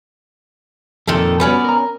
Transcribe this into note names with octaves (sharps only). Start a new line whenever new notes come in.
F2 A#2 D#3 A4
G3 B3 C#4 F#4 B4 D5
A#4 A#5